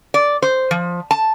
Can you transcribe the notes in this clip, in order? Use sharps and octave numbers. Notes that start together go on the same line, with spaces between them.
D5
C5
F3
A5